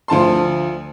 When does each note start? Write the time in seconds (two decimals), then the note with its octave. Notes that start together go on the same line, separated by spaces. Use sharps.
0.08 D2 F3 A5 C6